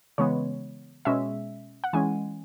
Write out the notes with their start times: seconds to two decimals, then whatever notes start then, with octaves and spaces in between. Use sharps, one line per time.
0.18 C#3 E3 G#3 B3 C#5
1.05 B2 G#3 C#4 E5
1.84 F#5
1.93 E3 G#3 C#4 G#5